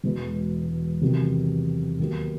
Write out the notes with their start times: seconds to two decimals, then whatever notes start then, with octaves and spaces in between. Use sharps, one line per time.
0.04 E1 E2 B2 G#3 B3
1.02 E1 E2 C3 D#3 F#3
1.99 D#2 D#3 F#3 B3